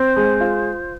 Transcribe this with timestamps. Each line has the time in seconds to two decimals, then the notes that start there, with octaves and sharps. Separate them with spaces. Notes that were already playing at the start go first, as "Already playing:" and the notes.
Already playing: C4 C5
0.17 G#3
0.41 F4